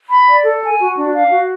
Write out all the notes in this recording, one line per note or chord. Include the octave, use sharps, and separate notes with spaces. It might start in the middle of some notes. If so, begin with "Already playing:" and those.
B5
D5
A4
G#5
F#4
D4
F5
F#4